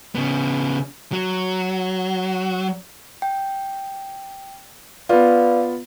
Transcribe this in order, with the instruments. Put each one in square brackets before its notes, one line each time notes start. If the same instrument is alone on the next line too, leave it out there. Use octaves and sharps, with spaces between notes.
[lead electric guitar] C#3 B3
F#3
[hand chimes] G5
[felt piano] B3 F4 [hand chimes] B4 D5 F5